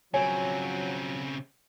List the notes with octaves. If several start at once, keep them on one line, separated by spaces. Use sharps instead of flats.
C#3 F3 F#3 C4 C#5 G#5